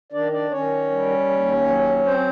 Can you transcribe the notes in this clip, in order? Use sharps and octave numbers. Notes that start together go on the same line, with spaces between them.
D#3 D4 D5
D4 D5
D#3 C#4 C#5
G3
D#2
F#3
C4 C5